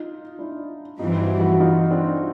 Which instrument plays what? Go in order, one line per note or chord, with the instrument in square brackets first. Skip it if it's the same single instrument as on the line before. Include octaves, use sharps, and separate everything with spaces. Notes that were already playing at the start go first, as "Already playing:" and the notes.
Already playing: [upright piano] D#4 F4
D4 E4
[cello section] G2 E3 G3 C4 [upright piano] D#4 F4
[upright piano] E4 F#4
E4 F#4
D#4 F4
C4 D4